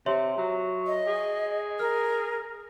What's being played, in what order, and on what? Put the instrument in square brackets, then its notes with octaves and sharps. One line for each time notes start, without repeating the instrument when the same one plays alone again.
[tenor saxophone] C3 [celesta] C#5 E5 C6
[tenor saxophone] F#3
[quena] D#5
[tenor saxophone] G#4
[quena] A#4 [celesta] F6